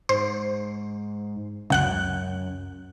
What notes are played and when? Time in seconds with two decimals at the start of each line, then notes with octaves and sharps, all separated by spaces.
0.09 G#2 C5
1.70 C#2 F#2 F#5 F#6